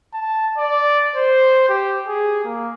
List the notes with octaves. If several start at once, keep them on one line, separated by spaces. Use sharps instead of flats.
A5
D5
C5
G4
G#4
A#3